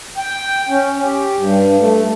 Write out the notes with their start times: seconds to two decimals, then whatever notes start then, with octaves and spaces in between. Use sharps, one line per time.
0.18 G5
0.69 C#4
1.00 G4
1.37 G2
1.79 A3